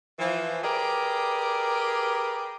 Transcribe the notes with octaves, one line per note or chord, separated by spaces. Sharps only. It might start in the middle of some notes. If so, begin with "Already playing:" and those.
E3 F3
G4 G#4 A#4 B4 D5